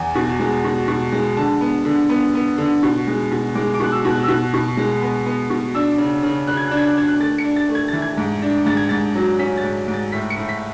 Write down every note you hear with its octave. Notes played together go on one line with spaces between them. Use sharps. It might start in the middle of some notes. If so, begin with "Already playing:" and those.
Already playing: E2 G#5
B2
G#3
B2
B2
G#3
D3 A5
B3
D3
B3
B3
D3
B2
G#3
B2
G#3 D6
D6
B2 F#6
E6
B2
F#6
E6
B2 F#6
B2
G#3
B3
B3
B2
D4 E6
C#3
C#3
C#3 F#6
G#6
D4 F#6
G#6
F#6
D4 G#6
F#6
A3 A6
C#7
D4
A6
A3
G#6
E3 A6
G#6
G#2
D4
G#2 A6
G#6
G#2 A6
F#3
C#4 B6
A6
G#2
G#2
A6
A2 B6
C#7
A2
B6